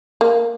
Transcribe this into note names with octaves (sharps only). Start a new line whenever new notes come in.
A#3